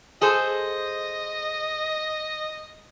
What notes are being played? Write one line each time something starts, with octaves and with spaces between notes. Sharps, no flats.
G#4 A4 C5 D#5